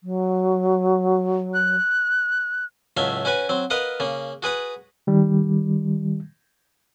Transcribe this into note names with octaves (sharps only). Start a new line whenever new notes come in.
F#3
F#6
C#2 A2 F#3 E5 F5
C#4 F#4 B4 G#5
F#3 C4
A#4 B4 D#5 F5 F#5
C#3 A#3
F#4 G#4 B4 F#5
D#3 G3